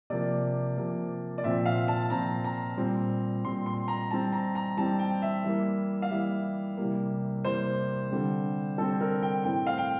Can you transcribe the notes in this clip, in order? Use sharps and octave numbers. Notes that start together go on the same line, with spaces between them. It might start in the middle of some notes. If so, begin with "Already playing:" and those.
C3 F3 A#3 D5
C3 F3 A#3
D5
A#2 F3 C4 E5
F5
A5
A#2 F3 C4 A#5
A#5
A#2 G3 C4
A#2 G3 C4 C6
C6
A#5
E3 G3 C4 A5
A#5
A#5
E3 G3 C4 A5
G5
E5
E3 G3 A#3
F5
E3 G3 A#3 E5
C3 E3 G3 A#3
C3 E3 G3 A#3 C5
D3 G3 C4
D3 G3 C4 A4
A#4
G5
A2 E3 A3 C4 G5
F5
G5